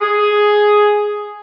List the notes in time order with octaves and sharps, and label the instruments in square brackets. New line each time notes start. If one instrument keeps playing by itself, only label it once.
[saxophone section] G#4